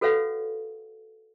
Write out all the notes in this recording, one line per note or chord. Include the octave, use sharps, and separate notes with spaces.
F#4 A4 B4 C#5 F5 F#5